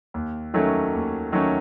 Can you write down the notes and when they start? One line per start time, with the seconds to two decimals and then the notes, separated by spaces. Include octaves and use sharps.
0.14 D#2
0.54 D#3 F#3 A3 C#4
0.93 D#2
1.32 D#3 F#3 A3 C#4